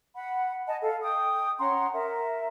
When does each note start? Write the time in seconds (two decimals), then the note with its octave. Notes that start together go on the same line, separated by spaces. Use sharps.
0.16 F#5 B5
0.67 D#5 G#5 A5
0.82 A4 F5
1.02 G5 D#6
1.59 C#4 F#5 A#5 C6
1.94 A#4 E5